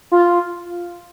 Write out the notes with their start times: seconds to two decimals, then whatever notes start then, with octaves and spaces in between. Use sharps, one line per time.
0.12 F4